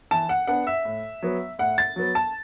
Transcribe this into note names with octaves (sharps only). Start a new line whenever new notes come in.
E3 A5
F#5
B3 D4 F#5
E5
A2
F#3 B3
A2 F#5
A6
F#3 B3
A5